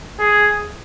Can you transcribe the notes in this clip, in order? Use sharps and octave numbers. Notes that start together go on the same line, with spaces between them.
G#4